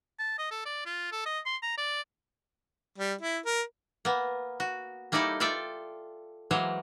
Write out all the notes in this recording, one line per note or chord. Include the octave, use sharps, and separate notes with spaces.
A5
D#5
A4
D5
F4
A4
D#5
C6
A#5
D5
G3
E4
A#4
A#3 B3
F#4
G3 A#3 D#4 E4 A4 D5
F4 A4 D5 E5 G5
E3 F#3 G#3 A#3 C5 C#5